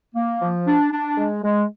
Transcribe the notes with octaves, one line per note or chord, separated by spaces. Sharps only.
A#3
F3
D4
D4
G#3
G#3